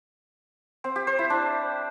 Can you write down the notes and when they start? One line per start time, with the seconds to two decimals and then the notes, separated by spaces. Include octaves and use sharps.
0.84 C4
0.96 G4
1.07 C5
1.19 E4
1.30 D4